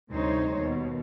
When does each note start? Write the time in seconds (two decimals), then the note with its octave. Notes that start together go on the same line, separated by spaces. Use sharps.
0.11 D2 C3 G3 D#4 C5 C#5
0.59 D#2 B2